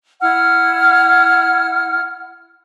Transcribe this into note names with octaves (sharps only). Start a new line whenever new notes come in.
E4 F#5 F6